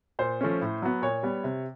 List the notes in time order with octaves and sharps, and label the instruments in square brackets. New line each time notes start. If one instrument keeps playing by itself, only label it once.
[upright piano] A#2 C5
F3 A3 C#4
A2
F#3 B3
A#2 C#5
G3 B3
C3